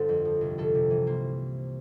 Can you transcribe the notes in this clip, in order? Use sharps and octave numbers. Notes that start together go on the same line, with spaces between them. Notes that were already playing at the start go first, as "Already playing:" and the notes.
Already playing: G1 D3 A4 C5
F2
F3
C2
C2 A4
C3
E3
A#3 C5